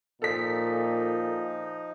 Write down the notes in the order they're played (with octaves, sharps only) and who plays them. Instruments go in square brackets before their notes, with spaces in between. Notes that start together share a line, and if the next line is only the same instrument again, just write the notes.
[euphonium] A#2 [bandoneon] F3 D#4 [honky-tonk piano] A4 B6